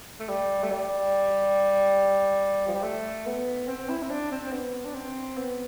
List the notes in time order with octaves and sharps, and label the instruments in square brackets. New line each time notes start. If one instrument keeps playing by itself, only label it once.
[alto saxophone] A3
G3
A3
G3
F3
G3
A3
B3
C4
E4
C4
D4
C4
C4
B3
D4
C4
B3